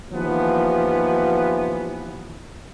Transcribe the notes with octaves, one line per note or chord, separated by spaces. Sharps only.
D#2 E3 F3 B3